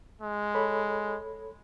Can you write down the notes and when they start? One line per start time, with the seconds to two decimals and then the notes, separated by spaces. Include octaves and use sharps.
0.22 G#3
0.55 A4 C#5 B5